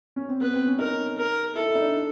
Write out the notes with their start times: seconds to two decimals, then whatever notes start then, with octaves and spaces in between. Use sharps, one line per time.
0.16 C#4
0.29 C4
0.41 B3 B4
0.54 C4
0.66 C#4
0.79 D#4 A#4
1.17 A#4
1.55 E4 A4
1.68 E4
1.75 D#4
1.81 D4